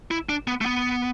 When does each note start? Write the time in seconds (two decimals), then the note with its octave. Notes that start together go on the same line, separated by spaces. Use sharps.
0.11 E4
0.29 D4
0.48 B3
0.61 A3
0.66 B3